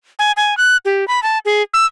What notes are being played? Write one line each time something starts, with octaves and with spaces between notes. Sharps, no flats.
G#5
G#5
F#6
G4
B5
A5
G#4
E6